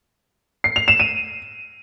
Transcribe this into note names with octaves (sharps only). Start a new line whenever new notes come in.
C7
F7
E7
D#7